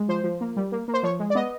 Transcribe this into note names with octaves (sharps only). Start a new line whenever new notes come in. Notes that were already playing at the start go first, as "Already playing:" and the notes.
Already playing: G#3
F3 C5
F3
A#3
G3
A#3
A#3
C5
F3 C#5
G#3
D5
B3 D#5